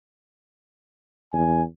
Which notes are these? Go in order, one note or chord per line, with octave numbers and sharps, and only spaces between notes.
E2 G#5